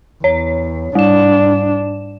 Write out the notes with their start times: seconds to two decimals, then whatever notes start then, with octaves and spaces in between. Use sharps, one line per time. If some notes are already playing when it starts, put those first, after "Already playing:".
0.24 E2 C#5
0.95 G#2 G3 D4 E7